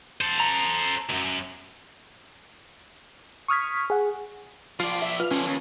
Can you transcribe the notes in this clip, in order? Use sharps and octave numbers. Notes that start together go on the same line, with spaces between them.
A4 C5
A#5
C#2 F#2
C#6 D#6 F6 G#6 B6
G#4 F#5
F3 F4 D5 C7
E5
F4 B4 F6
D3 F3 C#4
D#2